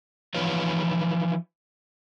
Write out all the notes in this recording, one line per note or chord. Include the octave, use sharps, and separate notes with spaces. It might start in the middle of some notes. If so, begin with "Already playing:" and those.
E3 F3 D#4 F4 B4 C#5